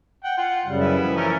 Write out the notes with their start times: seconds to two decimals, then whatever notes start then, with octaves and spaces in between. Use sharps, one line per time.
0.24 F#5 G5
0.38 F4 F#5
0.66 F#2 C#3 G3
0.80 B3 E4
1.01 E3 F3
1.17 A3 C#4 A#4